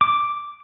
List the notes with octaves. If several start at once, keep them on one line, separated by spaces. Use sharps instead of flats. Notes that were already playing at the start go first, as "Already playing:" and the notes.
D6